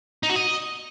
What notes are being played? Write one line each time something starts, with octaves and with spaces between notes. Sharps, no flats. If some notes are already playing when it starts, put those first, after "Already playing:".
D#4
F#4
D#5